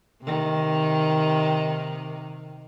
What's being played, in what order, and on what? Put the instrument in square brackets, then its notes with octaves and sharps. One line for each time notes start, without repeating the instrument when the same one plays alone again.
[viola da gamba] C3 D#3